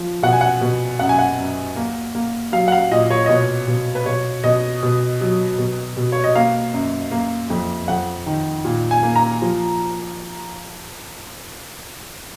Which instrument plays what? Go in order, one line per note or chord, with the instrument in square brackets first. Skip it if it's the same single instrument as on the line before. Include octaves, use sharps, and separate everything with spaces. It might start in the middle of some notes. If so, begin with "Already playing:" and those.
Already playing: [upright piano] F3
B2 F#5
G#5
F#5
B2
F#2 F#5
G#5
F#5
F#2
A#3
A#3
F#3 F5
F#5
F5
A#2 D#5
C#5
D#5
B2 C#5
B2
B4
B2 C#5
B2 D#5
B2
F#3
B2
B2
C#5
D#5
A#3 F5
F#2
A#3
F2
F2 F#5
D#3
A#2
G#5
A#3
A#5
F3